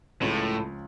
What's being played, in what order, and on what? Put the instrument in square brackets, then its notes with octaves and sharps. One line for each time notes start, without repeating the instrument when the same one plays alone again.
[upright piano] C#2 C#3 F3 [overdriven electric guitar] A2